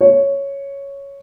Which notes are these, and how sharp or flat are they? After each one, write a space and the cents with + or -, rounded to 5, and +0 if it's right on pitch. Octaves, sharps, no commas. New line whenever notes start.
C#5 +0